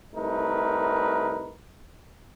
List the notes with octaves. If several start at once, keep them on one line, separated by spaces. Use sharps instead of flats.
C2 A3 D#4 A#4 B4